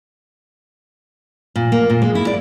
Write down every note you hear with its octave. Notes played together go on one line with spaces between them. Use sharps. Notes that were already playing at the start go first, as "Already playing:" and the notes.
A#2
A#3
A#2
G#3
E4
D5